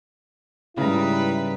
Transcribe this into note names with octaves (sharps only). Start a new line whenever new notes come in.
G#2 C#3 G3 E4 B4 A#5